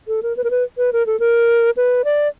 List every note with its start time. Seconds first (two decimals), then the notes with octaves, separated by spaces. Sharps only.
0.08 A4
0.23 A#4
0.37 B4
0.44 A#4
0.51 B4
0.78 B4
0.93 A#4
1.06 A4
1.20 A#4
1.77 B4
2.05 D5